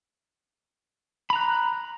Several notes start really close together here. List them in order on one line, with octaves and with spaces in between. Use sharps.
B5 A#5 F#6